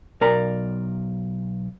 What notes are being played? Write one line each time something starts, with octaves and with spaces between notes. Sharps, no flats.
B1 A#4 D5 A#5